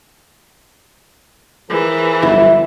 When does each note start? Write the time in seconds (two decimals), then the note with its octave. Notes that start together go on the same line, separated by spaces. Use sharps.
1.70 E3 F3 G#4 A#4
2.22 G1 F2 F#3 E4